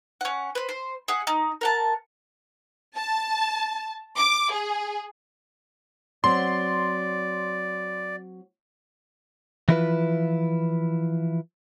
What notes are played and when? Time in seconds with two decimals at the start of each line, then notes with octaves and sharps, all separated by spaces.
0.21 C#4 F#5
0.55 B4 C5
0.69 C5
1.08 G#4 E5 F#5 D#6
1.27 D#4
1.61 A#4 F#5 A5
2.96 A5
4.18 D6
4.53 G#4
6.24 F#3 C4 D5 C6
9.69 E3 F3 E4 F4 B4